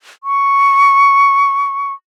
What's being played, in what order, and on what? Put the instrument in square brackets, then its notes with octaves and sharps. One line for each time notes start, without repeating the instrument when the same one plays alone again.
[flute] C#6